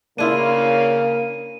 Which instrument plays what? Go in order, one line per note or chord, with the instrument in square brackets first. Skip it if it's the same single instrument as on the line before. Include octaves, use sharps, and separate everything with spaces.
[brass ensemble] C#3 [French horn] A#3 [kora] D4 E4 F4 [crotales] D#7